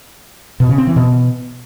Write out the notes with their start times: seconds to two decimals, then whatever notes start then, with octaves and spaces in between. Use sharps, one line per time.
0.60 B2
0.69 C#3
0.78 C4
0.87 E3
0.96 B2